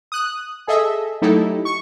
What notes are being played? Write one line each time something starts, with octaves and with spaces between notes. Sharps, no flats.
D#6 F#6
G#4 A4 D#5 E5
F#3 A3 D#4 E4 G4 A4
C#6